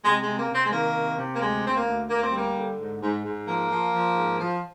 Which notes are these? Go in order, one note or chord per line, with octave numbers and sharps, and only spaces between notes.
C3 G#3
G#3
C3
A#3
C3
C4
G#3
D#3 A#3
C3
C3
A#3
D2 G#3
D2 C4
A#3
D2
D2 A#3
C4
G3 A#3
D3
G#2
G#2
G#2
F3 A#3
F3
F3
G#2
F3